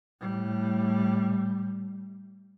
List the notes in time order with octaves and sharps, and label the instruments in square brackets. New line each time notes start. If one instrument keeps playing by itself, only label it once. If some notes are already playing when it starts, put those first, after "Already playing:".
[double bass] A2 G3